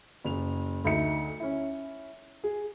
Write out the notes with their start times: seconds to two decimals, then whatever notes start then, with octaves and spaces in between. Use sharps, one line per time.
0.24 F#1 F7
0.84 D2 D#4 E5 C#7
1.40 C#4 E4
2.44 G#4